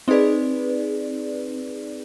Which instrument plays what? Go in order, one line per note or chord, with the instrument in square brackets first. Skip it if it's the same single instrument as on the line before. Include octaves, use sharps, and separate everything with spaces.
[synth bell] C4 D#4 G#4 B4 D5